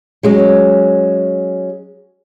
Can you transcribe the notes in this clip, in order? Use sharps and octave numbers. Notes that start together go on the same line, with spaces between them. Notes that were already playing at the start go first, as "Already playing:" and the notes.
F#3 G#3 C#4